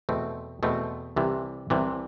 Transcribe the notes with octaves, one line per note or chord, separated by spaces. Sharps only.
E2 B2 A3 C4
E2 B2 A3 C4
C2 C3 E3
C2 C3 E3